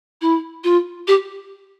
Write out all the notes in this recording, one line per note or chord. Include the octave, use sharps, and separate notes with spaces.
E4
F4
G4